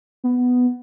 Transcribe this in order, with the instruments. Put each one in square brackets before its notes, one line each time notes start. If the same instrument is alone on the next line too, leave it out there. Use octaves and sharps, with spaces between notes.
[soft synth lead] B3